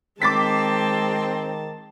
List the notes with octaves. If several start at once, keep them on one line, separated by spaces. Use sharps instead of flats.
D#3 G#3 C4 A5 D6 A6 B6